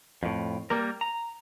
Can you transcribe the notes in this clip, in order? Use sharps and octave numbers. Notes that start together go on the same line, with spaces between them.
F2 A2
G3 A#3 A#4
A#5